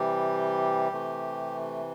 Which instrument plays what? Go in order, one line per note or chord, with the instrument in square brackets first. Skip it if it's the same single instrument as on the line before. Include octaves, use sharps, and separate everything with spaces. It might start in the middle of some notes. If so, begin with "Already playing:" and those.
Already playing: [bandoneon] C3 E3 G3 G4
C3 E3 A3